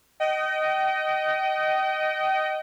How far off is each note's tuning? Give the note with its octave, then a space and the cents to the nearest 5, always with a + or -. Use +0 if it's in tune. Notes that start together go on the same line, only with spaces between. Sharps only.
D#5 +0 G5 -40